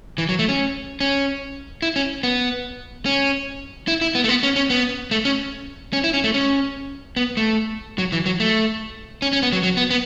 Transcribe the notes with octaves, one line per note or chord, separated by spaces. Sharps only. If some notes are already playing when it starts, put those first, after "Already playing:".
E3
F#3
A3
C#4
C#4
E4
C#4
B3
C#4
E4
E4
B3
A3
B3
C#4
C#4
B3
A3
C#4
C#4
E4
C#4
A3
C#4
B3
A3
F#3
E3
F#3
A3
C#4
C#4
B3
F#3
F#3
B3
B3